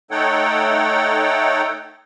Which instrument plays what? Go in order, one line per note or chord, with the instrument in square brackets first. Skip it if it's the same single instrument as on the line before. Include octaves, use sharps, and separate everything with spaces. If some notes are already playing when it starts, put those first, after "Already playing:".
[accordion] A3 D#4 A4 C#5 F#5 G5